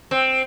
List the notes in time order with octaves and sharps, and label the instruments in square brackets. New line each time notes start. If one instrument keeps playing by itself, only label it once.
[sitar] C4